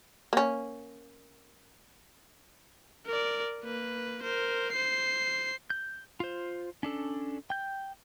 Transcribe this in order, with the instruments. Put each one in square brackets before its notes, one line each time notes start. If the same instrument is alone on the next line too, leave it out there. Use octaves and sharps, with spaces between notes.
[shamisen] A#3 C#4
[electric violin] A#4 D5
A#3 B4
A#4 C5
C5 C7
[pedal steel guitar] G6
F4 C5
C#4 D4 A4
G5 G6